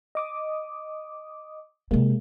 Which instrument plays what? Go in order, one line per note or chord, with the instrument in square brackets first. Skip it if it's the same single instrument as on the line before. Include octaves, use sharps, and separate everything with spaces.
[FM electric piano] D#5 D6 D#6
[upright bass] C3 C4 [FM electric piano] G#3 A#3